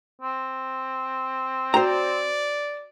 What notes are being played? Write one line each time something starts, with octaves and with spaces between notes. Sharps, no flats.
C4
F#4 C5 D5 G5 A#5